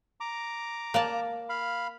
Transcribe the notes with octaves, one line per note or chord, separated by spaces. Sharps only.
A#5 D6
A#3 D5 A5
F5 B5